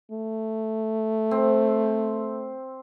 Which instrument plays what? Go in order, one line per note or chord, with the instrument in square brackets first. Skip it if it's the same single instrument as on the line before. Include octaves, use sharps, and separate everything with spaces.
[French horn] A3
[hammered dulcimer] C4